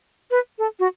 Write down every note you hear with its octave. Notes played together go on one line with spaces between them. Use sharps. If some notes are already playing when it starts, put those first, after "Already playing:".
B4
A4
F#4